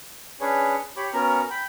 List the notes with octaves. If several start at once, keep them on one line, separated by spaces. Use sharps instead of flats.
C#4 D4 G#4 B4 C#5
G4 C#5 B5 D6
B3 C#4 F#4 A#4 A#5
G5 B5